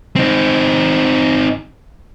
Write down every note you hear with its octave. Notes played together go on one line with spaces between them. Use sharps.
C4 D#4